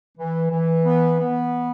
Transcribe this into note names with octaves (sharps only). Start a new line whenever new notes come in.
E3
E3
B3
B3